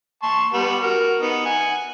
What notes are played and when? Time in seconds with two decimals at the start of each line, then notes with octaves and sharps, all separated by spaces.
0.23 A5 C6 C#6
0.53 G3 B3
0.82 F#4 A#4
1.21 B3 D#4
1.46 F#5 G#5